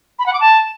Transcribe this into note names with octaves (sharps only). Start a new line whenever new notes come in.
B5
F#5
D6
A5